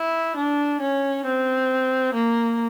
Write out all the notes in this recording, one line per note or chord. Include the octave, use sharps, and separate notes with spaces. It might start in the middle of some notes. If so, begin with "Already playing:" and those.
Already playing: E4
D4
C#4
C4
A#3